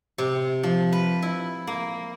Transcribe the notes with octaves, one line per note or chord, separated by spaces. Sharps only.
C3
F3
B4
E4
A#3